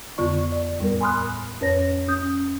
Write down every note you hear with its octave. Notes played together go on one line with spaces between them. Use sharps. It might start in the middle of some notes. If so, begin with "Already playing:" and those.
F2 D3 B3 F4 D5 C#6
D5
D#2 A2 G3 B3 A#4
G#5 B5 C6 D#6 F6 F#6
F2 C#4 B4 C#5 A#6
C#4 D#6 G6